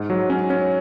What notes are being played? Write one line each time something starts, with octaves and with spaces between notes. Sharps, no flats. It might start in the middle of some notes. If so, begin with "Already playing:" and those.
Already playing: G#2
F#3
C#4
C#4